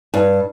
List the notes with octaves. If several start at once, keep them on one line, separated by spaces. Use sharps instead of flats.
G2